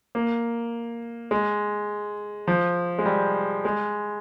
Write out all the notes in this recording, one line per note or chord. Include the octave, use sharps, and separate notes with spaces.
A#3
G#3
F3
G#3
G3
G#3